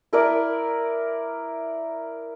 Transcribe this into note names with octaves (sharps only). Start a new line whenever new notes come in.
E4 A#4 B4 D5